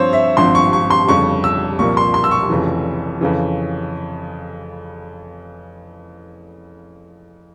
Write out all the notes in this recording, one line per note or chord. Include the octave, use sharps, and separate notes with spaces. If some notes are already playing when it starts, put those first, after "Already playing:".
Already playing: G2 F3 C4 C5 C#5
E5
G#1 G2 F3 C4 C6
C#6
C#6
C6
G1 F2 C#3 G3 C#6
E6
C2 A#2 F3 A#3 C#6
C6
C6
E6
C#6
F1 F2 C#3 E3
F2 C#3 E3